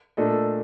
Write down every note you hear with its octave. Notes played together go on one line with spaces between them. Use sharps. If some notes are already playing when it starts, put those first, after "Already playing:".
A#2 A3 D4 A4 D#5